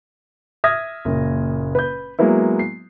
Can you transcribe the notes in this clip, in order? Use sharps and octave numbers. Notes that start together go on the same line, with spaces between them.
E5 D#6 F6 G#6 A#6
F#1 A#2
B4 G6
F#3 G#3 A#3 B3 E4
C7